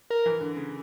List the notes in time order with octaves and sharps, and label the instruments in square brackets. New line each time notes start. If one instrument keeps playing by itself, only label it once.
[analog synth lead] A#4
[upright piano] E3
D3
C#3